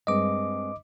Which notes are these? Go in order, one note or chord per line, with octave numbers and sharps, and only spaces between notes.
G2 G#3 C4 D#5 D6